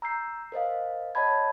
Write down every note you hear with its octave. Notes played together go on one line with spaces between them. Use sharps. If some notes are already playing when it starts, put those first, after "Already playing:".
A#5 E6 G6 C7
A#4 C5 D#5 F5
C#5 D#5 F#5 A5 B5 G#6